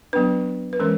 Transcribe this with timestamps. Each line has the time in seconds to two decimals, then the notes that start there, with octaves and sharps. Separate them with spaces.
0.13 F#3 B3 D4 B4
0.73 B4
0.79 E3 G#3 C#4 A#4